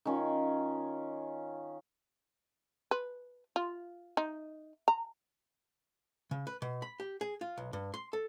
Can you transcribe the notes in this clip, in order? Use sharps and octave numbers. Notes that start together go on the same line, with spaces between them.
D#3 C#4 F4
B4
F4
D#4
A#5
C#3
B4
B2
B5
G4
G#4
F4
B1
G2
C6
A4